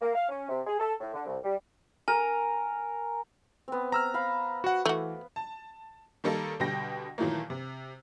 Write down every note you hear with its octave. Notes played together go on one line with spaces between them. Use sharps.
A#3
F5
C#4
C3
G#4
A4
A2
D3
C2
G3
A#4 G#5
B3 C4
A#5 E6 F6
F5 B5
F#4 F#5
E3 A3 F#4
A5
D#3 G3 A#3 D#4 A4
B2 D3 G3 G5 A#6
A#2 D#3 E3 F#3 A3 A#3
C3